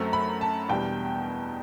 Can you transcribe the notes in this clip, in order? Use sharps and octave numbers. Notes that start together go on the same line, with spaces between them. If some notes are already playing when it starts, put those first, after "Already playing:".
Already playing: F#2 F#3 A3 C4
B5
A5
E2 B2 G3 D4 G5